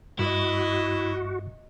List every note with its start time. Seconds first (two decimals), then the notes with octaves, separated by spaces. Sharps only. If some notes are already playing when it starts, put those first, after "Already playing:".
0.19 G2 E4 F#4 D#5 E5